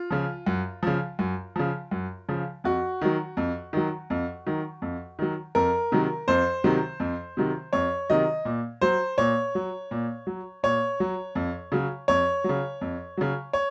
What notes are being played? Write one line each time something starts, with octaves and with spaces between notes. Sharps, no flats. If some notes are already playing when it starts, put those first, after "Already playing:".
Already playing: F4
C#3 F3
F#2
C#3 F3
F#2
C#3 F3
F#2
C#3 F3
F2 F#4
D#3 F#3
F2
D#3 F#3
F2
D#3 F#3
F2
D#3 F#3
F2 A#4
C3 D#3 F#3
F2 C5
C3 D#3 F#3
F2
C3 D#3 F#3
F2 C#5
C3 D#3 F#3 D#5
A#2
F#3 C5
A#2 C#5
F#3
A#2
F#3
A#2 C#5
F#3
F2
C#3 F#3
F2 C#5
C#3 F#3
F2
C#3 F#3
C#5